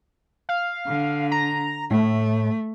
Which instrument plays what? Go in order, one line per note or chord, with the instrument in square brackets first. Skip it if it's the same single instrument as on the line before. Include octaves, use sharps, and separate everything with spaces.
[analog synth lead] F5
[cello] D3
[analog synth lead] A#5
[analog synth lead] A2 [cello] A3